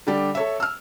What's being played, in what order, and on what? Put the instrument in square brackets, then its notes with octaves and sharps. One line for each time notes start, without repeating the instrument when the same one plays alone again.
[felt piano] D3 G3 G4 D5
A4 C#5 E5
E6 F6